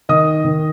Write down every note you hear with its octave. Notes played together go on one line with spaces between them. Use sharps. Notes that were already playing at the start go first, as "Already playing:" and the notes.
D#3 D#5 D#6
D#3